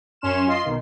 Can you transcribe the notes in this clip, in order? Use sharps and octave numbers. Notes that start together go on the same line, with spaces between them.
F#2 C#4 C6 F6 E7
F4 D#5 C6 C7
B1 D#3